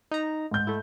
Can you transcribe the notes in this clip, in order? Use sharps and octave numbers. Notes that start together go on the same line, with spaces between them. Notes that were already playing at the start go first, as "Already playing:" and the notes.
D#4 A#5
G#2 G6
A3 E4